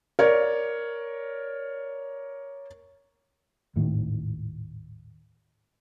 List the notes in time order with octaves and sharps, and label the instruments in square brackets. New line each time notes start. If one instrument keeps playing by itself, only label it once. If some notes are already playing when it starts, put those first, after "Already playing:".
[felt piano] A#4 C#5 D5
[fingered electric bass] D#1 G#1 A2 D#3